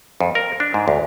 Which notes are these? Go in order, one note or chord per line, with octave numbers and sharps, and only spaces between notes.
F2
A#4
D4
G#2
D2